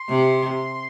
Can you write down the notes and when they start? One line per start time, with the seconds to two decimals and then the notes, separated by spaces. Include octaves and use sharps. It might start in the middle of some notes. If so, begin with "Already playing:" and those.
Already playing: C6
0.09 C3